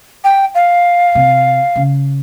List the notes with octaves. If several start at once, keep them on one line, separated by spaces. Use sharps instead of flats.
G5
F5
C3
C#3